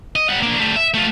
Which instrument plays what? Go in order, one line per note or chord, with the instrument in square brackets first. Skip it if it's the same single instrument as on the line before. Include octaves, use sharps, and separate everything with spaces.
[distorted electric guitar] D#5
G3 F#5
A#3 D4
G3 A3
E5
A3 F4